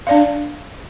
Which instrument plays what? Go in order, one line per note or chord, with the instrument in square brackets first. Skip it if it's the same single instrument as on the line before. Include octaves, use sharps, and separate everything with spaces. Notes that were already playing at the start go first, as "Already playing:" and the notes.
[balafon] D4 D5 F5